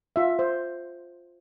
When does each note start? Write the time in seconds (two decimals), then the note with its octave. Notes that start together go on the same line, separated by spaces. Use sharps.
0.16 F4 E5
0.39 C5